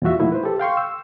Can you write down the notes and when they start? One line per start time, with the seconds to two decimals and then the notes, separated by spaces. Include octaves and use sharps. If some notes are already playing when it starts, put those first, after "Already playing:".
0.02 E2 A#2 G3 F4 F#4 E5
0.20 A#2 F3 A3 D#4 E4
0.32 B4 C5
0.43 G4 A4
0.59 F5 G5 C6 C#6
0.77 E6